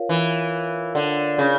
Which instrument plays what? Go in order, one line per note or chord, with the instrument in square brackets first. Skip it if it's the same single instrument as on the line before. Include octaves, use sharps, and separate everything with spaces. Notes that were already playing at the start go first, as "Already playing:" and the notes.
Already playing: [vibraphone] F4 A#4 C#5 F5
[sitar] E3
D3
C#3